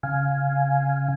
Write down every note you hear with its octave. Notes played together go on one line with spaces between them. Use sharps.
C#3 F5 G#5